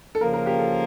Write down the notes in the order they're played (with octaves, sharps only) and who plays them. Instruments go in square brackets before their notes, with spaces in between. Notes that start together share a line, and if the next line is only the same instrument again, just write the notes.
[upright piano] A4
[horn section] C#3 F3 A#3 [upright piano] A#4
[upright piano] A#4
G4
A4